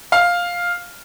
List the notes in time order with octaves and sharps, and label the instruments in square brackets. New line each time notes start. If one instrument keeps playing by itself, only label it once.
[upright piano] F5